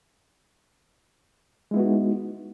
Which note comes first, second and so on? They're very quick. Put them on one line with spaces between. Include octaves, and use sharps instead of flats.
G#3 E4 B3 F#4 D#4